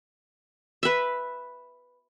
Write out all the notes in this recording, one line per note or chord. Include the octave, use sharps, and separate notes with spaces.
B4 E5